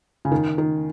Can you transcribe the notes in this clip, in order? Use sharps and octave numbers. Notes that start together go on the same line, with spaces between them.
C#3
D#3
D#3